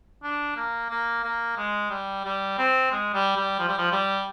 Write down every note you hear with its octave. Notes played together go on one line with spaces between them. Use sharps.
D4
A#3
A#3
A#3
G#3
G3
G3
C4
G#3
G3
G3
F3
G3
F3
G3